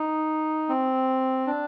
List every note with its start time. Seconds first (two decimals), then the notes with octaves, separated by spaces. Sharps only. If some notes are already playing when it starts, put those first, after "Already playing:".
Already playing: D#4
0.69 C4
1.47 D4